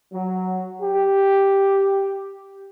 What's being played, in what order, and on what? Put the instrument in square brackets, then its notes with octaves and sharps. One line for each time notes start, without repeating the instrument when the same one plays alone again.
[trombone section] F#3
G4